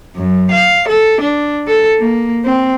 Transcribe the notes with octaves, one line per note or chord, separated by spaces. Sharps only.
F#2
F5
A4
D4
A4
A#3
C4